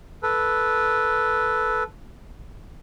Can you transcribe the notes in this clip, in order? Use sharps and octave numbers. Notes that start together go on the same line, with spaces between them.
A4 B4